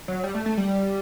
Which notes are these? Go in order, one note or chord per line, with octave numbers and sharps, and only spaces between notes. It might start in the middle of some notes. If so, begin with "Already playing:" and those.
F#3
G3
A3
A3
G3